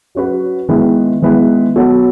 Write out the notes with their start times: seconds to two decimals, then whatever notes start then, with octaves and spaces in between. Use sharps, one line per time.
0.15 F#3 C#4 F#4 B4
0.69 D#3 G#3 B3 E4 B4
1.22 D#3 G#3 B3 E4 B4
1.76 F#3 B3 F#4 A4